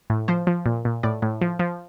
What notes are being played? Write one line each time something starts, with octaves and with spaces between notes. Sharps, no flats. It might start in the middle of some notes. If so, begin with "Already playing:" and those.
A2
F3 C5
F3
A#2
A#2
A2 D5
A2
F3
F3